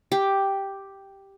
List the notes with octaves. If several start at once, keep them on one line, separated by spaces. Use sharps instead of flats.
G4